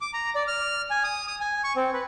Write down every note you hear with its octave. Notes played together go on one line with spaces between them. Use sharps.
D6
A#5
D5
F6
G#5
D#6
D#6
G#5
C#6
C4
B4